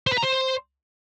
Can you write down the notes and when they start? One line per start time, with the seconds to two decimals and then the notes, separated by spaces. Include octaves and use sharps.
0.07 C5
0.12 B4
0.18 A#5
0.23 C5